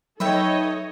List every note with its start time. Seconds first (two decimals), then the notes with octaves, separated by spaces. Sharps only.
0.20 F#3 D#4 A4 B4 C#5 D#5 E5 G5